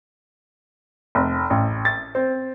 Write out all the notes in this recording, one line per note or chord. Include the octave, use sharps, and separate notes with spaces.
F1
A1
A6
C4